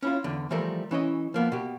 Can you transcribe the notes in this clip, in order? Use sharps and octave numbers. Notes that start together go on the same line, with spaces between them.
C#4 E4 F4
E2 D3
E3 F3 G3 A3 A#4 C5
E3 C#4 E4 D#5
F3 A#3 B3
B2 G4